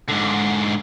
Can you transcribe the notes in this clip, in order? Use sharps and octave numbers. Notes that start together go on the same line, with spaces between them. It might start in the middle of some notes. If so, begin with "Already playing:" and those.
G#2 D3